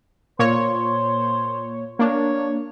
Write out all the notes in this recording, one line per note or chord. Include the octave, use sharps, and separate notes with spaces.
A#2 C5 C#5
A#3 D4 C#5